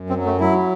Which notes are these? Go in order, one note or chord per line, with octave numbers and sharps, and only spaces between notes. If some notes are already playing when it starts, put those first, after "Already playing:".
Already playing: F#2
C4
F#3
A3
F#3 E4